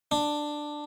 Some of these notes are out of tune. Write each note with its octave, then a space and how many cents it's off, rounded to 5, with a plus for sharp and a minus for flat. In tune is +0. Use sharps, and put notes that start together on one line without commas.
D4 +10